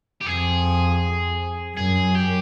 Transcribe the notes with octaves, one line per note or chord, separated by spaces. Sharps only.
G4
F2 G#4
F#2 G#4
G4